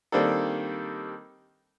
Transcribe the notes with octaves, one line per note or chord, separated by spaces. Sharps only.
D#3 G3 A#3 C4 D4 A4